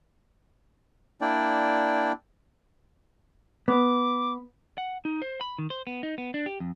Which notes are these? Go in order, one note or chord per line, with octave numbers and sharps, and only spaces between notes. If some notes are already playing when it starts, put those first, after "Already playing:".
A#3 D4 E4 D5 G5
B3 D6
F#5
D#4
C5
B5
D#3
C5
B3
D#4
B3
D4
G4
F2